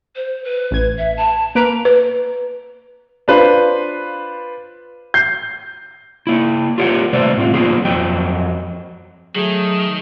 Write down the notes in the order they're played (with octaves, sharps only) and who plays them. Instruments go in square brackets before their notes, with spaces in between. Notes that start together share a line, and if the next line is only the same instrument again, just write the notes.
[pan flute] C5
B4
[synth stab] A1 G#6
[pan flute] E5
A5
[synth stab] A#3 B4 D7 [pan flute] A#5
[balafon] B4
[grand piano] D4 F4 B4 C5
G6 C7
[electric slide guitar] A#3 E4
F4 G4 A#4 C#5 F5 F#5
C3 A3 B4 C5 D5
A2 C4 F4
F#3 A#3 B3 F4 G#4
F2 F#3 D#5 G5
[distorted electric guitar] D#3 [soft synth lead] F#3 [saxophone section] A3 G#4